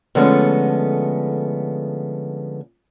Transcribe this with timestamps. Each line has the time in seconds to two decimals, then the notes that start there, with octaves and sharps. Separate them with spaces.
0.15 D3 F3 G#3 A3 B3 C#4